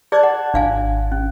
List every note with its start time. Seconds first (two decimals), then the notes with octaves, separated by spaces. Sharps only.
0.12 G#4 D5 A5 F#6 G#6
0.23 F#5
0.54 G#1 D4 F5 G#5
1.12 C#4